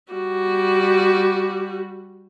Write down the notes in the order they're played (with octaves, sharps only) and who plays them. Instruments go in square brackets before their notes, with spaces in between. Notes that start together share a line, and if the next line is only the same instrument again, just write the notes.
[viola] G3 F#4